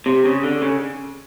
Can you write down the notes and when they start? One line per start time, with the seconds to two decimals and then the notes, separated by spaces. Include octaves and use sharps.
0.06 C3
0.25 C#3
0.43 D3
0.62 C#3